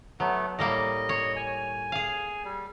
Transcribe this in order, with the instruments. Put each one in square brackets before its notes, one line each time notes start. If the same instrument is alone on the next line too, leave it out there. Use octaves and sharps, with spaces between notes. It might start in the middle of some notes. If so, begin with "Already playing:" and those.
[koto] F#3 [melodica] A3 B3
[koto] A2 G3 A#3 [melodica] D#5
[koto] C#5
[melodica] G#5
[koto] G#4 F5
[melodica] G3